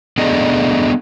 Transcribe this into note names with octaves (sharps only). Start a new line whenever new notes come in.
A3 B3 D4 G#4 D5 D#5